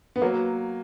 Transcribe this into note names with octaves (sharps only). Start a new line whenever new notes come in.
B3
F#3 A#3